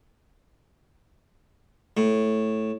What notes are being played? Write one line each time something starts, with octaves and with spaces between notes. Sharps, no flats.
A2